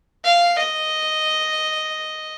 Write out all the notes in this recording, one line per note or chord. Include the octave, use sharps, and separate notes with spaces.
F5
D#5